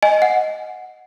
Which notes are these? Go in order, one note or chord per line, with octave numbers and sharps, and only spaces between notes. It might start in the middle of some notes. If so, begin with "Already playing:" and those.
D#5 G#5
F#5